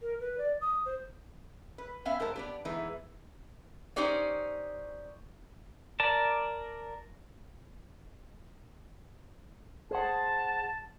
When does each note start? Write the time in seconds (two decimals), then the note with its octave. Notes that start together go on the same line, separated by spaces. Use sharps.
0.02 A#4
0.20 B4
0.38 D5
0.61 D#6
0.86 C5
1.78 B4
2.05 B3 C#4 E5 F5
2.20 G#2 A#4 C5 A5
2.36 B3 D4 G4
2.65 E3 G#3 A3 B3 D#4
3.96 C#4 D#4 G4 C5 D5 D#5
6.00 A#4 D5 A5
9.91 G#4 C5 F#5 A5